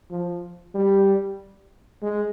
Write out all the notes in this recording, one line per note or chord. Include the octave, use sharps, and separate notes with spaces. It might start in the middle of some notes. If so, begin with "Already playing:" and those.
F3
G3
G#3